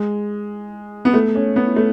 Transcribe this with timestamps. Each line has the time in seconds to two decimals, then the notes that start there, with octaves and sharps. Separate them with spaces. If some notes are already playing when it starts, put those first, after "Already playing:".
Already playing: G#3
1.05 B3
1.14 A3
1.35 C#4
1.56 B3
1.76 A3